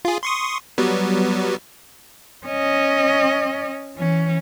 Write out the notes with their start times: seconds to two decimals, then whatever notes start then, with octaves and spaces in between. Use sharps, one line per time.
0.05 F4 G#4
0.23 C6 C#6 D#6
0.78 F#3 G3 B3
2.46 C#4 D#5
3.96 E3 C#4